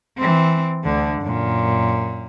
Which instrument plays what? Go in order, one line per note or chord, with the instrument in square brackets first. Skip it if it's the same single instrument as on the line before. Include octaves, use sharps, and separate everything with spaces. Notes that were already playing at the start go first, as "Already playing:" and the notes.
[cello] E3 C4
D2 D3
F#2 A#2